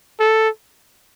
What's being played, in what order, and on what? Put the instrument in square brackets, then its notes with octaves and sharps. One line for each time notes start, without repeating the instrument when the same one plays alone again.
[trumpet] A4